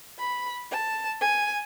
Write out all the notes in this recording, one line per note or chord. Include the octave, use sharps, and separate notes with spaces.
B5
A5
G#5